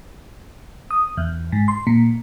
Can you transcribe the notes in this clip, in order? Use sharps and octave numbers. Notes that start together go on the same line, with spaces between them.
D#6
E2
G#2
C6
A#2